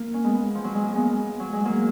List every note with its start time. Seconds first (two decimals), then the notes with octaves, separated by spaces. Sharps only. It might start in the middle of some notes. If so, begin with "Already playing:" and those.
Already playing: A#3
0.14 C#4
0.24 G#3 B3
0.55 F3
0.64 F#3
0.75 G#3
0.85 A#3
0.95 G#3 B3
1.40 F#3
1.53 G#3
1.65 F#3 A#3